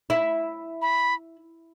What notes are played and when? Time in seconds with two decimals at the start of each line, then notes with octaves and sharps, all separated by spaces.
0.10 E4
0.82 B5